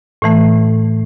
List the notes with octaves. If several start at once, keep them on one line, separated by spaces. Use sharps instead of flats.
A2 E3 A3